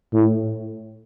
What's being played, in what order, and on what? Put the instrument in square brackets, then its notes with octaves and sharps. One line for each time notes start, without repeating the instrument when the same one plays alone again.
[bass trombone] A2